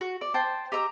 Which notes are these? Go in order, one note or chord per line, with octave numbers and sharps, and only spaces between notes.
F#4
D5
C5 G5 A5
G4 D#5 A#5 E6